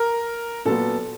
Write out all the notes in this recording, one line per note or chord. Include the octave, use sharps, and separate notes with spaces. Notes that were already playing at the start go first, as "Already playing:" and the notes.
Already playing: A#4
A#2 F#3 B3 A4